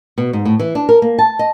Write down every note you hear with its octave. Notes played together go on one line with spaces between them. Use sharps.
B2
G#2
A2
E3
D4
A#4
A#3
A5
D#5